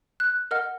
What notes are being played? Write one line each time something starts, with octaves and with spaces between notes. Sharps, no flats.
F#6
A#4 D#5 F#5 F6